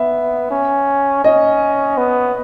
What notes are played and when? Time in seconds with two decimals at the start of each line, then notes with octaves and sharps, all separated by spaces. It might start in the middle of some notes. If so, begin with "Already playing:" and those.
Already playing: B3 E5
0.51 C#4
1.24 C#4 D#5
1.98 B3